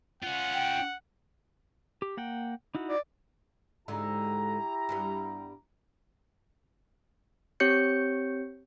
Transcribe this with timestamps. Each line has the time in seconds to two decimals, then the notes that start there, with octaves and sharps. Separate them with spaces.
0.23 C#4 F4 F#5
0.54 G5
2.02 G4
2.17 A#3 F#5 G5
2.75 D#4 E4 F#4
2.89 D5
3.88 G#2 D3 G#3 E4 G4 A#5
4.89 G2 G3 B3
7.60 C4 G4 C#5 G6 C#7